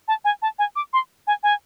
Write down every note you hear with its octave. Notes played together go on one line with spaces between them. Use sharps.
A5
G#5
A5
G#5
D6
C6
G#5
G#5